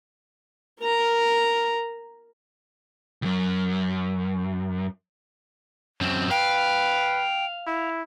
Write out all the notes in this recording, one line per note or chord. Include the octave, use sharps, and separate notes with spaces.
A#4 A#5
C#2 F#2
F#2 C4
B4 F5 G5
E4